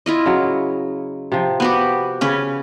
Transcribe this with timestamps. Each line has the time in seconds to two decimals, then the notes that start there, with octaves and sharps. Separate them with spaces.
0.06 E4 F4 D#5
0.26 C#3 F#3
1.32 C3 F3
1.60 B3 F#4 G4
2.21 C#3 C#4 B4